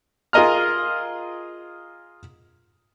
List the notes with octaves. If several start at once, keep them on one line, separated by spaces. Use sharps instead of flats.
F4 G#4 A#4 D#5 A#5 F6